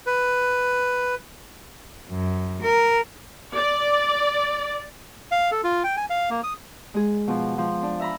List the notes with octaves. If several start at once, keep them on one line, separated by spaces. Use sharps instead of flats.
B4
F#2
A#4
D5
F5
A4
F4
G5
G#5
F5
A#3
D#6
G#3 G#4
B2 F3
F3
D4
E5 A#5 B5